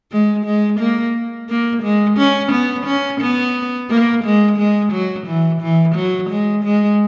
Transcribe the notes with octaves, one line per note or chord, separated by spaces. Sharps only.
G#3
G#3
A#3
A#3
G#3
C#4
B3
C#4
B3
A#3
G#3
G#3
F#3
E3
E3
F#3
G#3
G#3